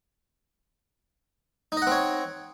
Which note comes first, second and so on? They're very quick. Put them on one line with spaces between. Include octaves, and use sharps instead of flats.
D#4 D#5 F#5 C4 C#5